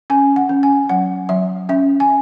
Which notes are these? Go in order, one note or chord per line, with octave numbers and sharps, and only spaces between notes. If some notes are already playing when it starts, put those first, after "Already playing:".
C#4 G#5
F#5
C#4
G#5
F#3 F#5
F#3 E5
C#4 E5
G#5